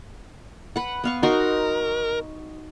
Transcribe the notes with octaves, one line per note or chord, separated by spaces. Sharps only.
B4 F#5
B3 F5 C#6
D#4 F#4 A#4 C6